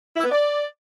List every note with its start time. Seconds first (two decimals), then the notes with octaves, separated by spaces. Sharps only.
0.16 E4
0.24 B3
0.31 D5